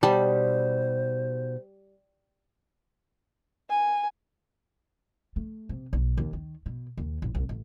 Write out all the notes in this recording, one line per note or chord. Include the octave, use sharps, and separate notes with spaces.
B2 G3 D#4 C5 A5
G#5
A3
C3
B1
D#2
D#3
B2
D#2
A1
C2
A1